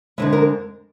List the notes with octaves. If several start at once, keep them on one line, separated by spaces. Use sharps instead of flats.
F2 D3 F3 G#3 E5
A#4